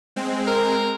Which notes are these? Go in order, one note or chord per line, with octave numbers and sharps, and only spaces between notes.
G#3 C4
A#4